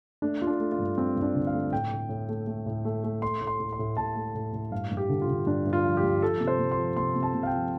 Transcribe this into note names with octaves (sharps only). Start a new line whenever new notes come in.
A3 D4
A3 F4
D4
A3
F4
G2
G2 C4
G2
D4
D3
F5
A3
A2 G5
A2
A2
A3
A3
A2
A3
A3
A3 C6
A2
C6
A2
C6
A2
A2 A5
A3
A2
A2
G2 F5
G2
G4
D3
F4
D3
G2 D4
G2
F4
F3
G4
G2
F3 A4
C3
C5
C3
C6
F3
C3 C6
C3
A5
C3
F5
G5
F3